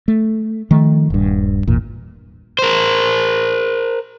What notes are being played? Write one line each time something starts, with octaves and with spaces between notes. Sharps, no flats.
A3
D#3 F3 A3
D#1 G2
G#1 E2 A#2
A#4 C5